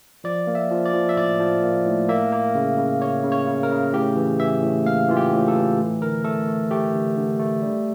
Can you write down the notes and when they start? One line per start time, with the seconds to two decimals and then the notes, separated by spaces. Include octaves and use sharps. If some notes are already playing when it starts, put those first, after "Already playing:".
0.24 F3 D5
0.47 A#3
0.55 E5
0.71 F3
0.85 D5
0.93 F3
1.09 E5
1.17 A2 D5
1.40 F3
1.64 A#3
1.86 A2
2.09 A#3 E5
2.32 A#3
2.55 C#3
2.78 C#3
3.01 A#3 C#5
3.24 C#3
3.32 C#5
3.47 C#3
3.63 A#4
3.70 C#3
3.94 A2 G4
4.16 E3
4.40 E3 E5
4.63 A2
4.85 A#3 F5
5.09 E3 F4
5.17 G4
5.32 A2
5.48 A4
5.55 E3
5.78 A3
6.01 D3 A#4
6.24 A3 A4
6.48 A3
6.71 A3 G4
6.93 D3
7.17 D3
7.39 A3
7.62 G3